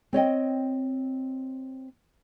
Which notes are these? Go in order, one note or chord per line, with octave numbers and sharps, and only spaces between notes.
C4 C#5 D#5 G5